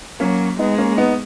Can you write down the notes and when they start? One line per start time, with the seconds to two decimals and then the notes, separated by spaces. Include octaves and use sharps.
0.20 F#3 A#3 C#4
0.59 G#3 B3 D#4
0.78 A#3 C#4
0.97 B3 D#4